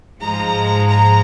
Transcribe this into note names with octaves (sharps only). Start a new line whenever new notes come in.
G#2 F3 G#3 A#5
A#5